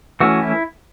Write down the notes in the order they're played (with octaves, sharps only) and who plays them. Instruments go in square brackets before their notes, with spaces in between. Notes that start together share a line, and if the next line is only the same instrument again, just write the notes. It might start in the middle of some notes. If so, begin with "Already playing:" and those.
[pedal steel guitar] E3 A3 C#4 F#4
E4